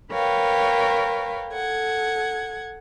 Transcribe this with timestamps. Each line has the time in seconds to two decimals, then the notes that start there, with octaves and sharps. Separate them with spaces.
0.11 A#4 B4 C#5 F5 G5
1.51 A4 F#5 G#6